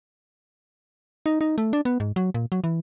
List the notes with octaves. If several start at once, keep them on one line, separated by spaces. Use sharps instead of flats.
D#4
D#4
A3
D4
B3
G#2
F#3
A#2
F#3
E3